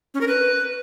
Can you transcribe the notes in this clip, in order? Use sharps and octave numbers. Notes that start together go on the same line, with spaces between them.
C#4
A#4
B4